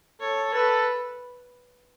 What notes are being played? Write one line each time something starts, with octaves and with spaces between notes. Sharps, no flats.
A4 C#5
A4 B4